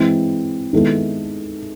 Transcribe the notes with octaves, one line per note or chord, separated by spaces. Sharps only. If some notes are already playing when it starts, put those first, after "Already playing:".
Already playing: E3 G#3 C4 E4
D#3 G#3 B3 E4 A4